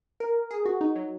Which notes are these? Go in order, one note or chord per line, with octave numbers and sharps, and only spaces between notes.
A#4
G#4
F#4
D#4
F#3